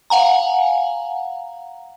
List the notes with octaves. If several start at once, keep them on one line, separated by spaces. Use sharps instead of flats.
F5 F#5 G#5 A#5